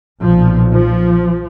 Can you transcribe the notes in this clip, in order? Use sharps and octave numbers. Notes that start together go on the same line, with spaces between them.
B1 A#2 F3
F3